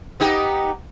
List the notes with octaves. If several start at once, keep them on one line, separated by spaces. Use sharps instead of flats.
B3 D#4 G4